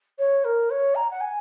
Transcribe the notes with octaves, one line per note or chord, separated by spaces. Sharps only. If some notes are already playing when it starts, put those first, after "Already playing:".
C#5
A#4
C#5
A#5
F#5
G#5